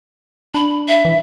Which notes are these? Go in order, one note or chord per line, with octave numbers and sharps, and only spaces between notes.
D4 B5
E5
E3